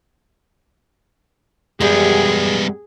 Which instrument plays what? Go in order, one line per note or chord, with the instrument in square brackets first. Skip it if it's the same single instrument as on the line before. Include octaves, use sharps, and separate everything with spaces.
[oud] F#2 G3 [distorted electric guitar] G#3 B3 [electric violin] G#4